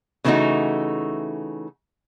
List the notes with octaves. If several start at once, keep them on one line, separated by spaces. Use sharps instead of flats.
C#3 E3 A3 C4 D#4 F#4